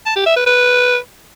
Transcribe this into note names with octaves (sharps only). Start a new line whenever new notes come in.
A5
G4
E5
B4
B4